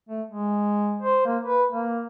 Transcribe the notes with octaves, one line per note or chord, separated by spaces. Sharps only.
A3
G#3
C5
A#3
B4
A#3